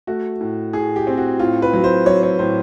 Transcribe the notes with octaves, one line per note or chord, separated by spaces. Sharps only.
A3 F#4
A2
A2 G#4
G4
C4
F#4
A2 F4
B4
F#3
C5
F#3 C#5
C#5
A2 C5